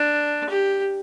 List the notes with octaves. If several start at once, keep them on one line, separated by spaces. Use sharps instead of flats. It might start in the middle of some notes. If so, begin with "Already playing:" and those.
Already playing: D4
G4